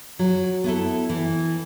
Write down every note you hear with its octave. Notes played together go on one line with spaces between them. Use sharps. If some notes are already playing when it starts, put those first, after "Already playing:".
F#3
B3 E4 A4
E3